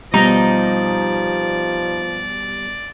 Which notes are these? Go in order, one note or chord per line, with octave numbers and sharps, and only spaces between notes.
B2 F3 G3 D#4 D5 D#5 A#5